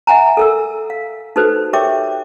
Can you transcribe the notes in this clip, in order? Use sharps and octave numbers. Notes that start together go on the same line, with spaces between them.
E5 F#5 G#5 A#5
A4 A#4 E6
F5
D#4 F#4 A4 B4 C5
G4 A#4 C#5 E5 G5 D6